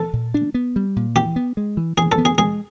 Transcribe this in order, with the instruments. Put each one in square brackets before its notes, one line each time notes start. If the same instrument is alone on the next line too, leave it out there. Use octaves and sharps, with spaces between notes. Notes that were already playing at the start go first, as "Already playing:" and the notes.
Already playing: [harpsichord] A4
[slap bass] A#2
D4
B3
G3
A#2
[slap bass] E3 [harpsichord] G4
[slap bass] B3
G#3
E3
[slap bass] E3 [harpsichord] G#4
[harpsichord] A4
[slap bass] B3
[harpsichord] G#4
[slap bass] G#3 [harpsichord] G#4